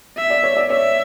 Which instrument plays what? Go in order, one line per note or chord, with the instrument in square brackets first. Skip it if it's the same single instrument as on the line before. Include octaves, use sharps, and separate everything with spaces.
[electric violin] E5
[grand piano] D5
C#5
D5
[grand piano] C#5 [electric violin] E5